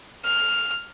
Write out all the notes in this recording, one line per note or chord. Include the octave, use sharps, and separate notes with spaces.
F6